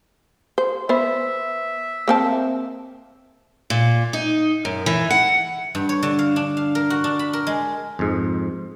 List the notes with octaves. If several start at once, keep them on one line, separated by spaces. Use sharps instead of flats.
C5
B3 C5 E5
A#3 C4 A5
A#2
D#4
F#2
E3
F#5
G2
C#5
D3
F5
D4
F5
A#4
F#4
D4
B5
A#4
G#3
F2 G#2